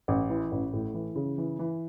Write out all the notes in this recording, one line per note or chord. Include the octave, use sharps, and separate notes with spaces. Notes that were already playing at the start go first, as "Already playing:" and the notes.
A1
E3
A1
A2
E3
C#3
E3
E3